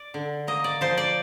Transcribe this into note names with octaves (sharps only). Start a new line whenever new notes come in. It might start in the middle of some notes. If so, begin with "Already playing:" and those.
Already playing: D5
D3
A#3 D#5
D5
F3 C5
D5